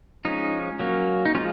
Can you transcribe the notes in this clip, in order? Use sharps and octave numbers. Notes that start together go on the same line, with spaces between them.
F3 G#3 C#4 D#4
F#3 A#3 C#4
D#4
F3 G#3 C#4 F4